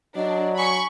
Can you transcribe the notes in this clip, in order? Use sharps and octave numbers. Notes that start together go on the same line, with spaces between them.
F#3 D4 D#5
G#5 B5 C#6